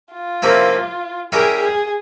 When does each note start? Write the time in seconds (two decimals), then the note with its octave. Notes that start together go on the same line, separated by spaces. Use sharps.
0.13 F4
0.42 C3 F3 A#3 C#4 E4
1.32 G3 C#4 E4 G4 G#4 A#4
1.62 G#4